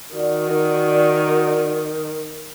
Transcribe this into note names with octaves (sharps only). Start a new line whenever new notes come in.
D#3 F#4 D5